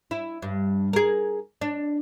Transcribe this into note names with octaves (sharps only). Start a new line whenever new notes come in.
E4
G2
G#4 A#4
D4